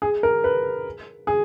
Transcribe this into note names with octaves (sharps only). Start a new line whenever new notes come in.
G#4
A#4
B4
G#4